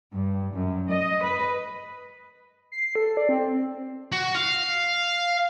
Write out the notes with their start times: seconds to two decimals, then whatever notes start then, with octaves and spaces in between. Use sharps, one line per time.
0.13 G2
0.54 F#2
0.91 D#5
1.23 B4
2.72 C7
2.95 A4
3.17 D5
3.29 C4
4.12 F#4
4.35 F5